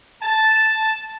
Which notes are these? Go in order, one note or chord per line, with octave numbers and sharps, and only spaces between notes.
A5